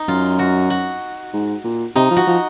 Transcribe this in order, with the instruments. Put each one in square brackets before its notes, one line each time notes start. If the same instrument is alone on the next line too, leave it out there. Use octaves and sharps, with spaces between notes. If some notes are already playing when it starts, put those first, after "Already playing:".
Already playing: [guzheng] D#4
[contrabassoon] F#2 [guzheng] F4
[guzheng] F#4
F#4
[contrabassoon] G#2
A#2
[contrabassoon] C3 [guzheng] D#4
[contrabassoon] F3
[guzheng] F#4
[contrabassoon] F3